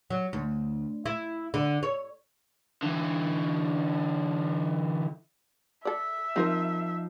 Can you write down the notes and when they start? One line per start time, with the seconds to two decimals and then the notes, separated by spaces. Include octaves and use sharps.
0.10 F#3
0.33 D2
1.06 E4
1.54 D3
1.83 C#5
2.83 D3 E3
5.85 A4 D5 E5
6.36 F3 C4 D#4 F4 A#4 C5